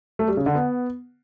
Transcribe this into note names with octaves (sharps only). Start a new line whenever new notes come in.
A3
G3
C#3
D3
B3